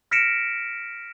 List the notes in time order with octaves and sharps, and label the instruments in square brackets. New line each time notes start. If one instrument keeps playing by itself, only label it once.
[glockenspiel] F6 A#6 B6 C#7 D7 E7